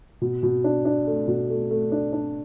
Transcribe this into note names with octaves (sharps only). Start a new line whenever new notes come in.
B2
B2
D4
D4
A3
B2
A3
A3
D4
D4